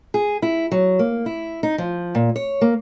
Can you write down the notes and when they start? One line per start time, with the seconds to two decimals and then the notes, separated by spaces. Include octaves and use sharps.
0.14 G#4
0.42 E4
0.71 F#3
0.99 A#3
1.26 E4
1.63 D#4
1.78 F3
2.15 A#2
2.36 C#5
2.61 A#3